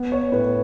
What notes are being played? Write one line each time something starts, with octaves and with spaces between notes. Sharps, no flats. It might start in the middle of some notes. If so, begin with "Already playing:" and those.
Already playing: B3
C#5
A2 B4